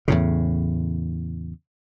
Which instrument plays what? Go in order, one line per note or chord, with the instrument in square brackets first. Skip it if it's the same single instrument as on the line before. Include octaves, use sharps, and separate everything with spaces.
[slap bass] E2 A2 C#3